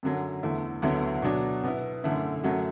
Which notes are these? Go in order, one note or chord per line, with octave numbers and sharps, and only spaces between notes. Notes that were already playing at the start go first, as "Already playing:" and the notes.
F#2 D3 F#3
E2 D3 A3 E4
D2 D3 F#3 B3 E4
B2 F#3 D4 F#4
B2 B3 E4
F#2 D3 A3 E4
F#2 F#3 A3 F#4